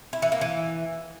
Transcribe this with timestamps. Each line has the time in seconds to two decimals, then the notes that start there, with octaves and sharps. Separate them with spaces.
0.13 E4
0.22 E3
0.32 A#3
0.41 E3